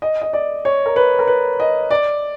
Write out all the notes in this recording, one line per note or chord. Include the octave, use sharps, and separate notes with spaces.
D#5
D#5
D5
C#5
A#4
B4
A#4
B4
D#5
D5